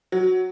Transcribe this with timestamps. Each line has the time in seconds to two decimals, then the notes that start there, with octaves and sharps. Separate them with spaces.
0.12 F#3